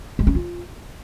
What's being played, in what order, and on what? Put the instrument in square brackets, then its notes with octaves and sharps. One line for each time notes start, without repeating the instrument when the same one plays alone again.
[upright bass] G#3
C#4
F4